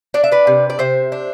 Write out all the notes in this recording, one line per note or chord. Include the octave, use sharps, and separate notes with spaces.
D4 D5
E5
B4 D5
C3
D5
C3 C5 E5
D4